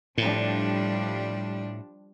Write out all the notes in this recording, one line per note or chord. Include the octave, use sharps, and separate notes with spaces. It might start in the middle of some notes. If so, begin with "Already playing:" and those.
A2 F3 G3 D4